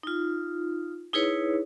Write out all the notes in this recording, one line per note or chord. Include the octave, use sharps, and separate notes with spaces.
D#4 F4
D#4 E4 G#4 B4 C#5